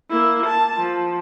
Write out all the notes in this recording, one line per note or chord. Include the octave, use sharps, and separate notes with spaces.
A#3 E4
A5
F3